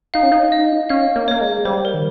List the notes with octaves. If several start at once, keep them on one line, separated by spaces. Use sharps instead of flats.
D#4 F5
C#4
D#4
D#5
C#4 F5
A#3
A#3 C#5
G#3
G3 C5
A#4
D#3